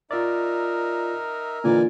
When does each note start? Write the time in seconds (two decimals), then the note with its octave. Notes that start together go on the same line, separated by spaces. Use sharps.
0.11 D#4 F4 A#4 D5 E5
1.64 A#2 D3 E3 D#4 D5 G#5